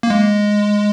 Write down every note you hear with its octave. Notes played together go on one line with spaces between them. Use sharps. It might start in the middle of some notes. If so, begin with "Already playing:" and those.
A#3
G#3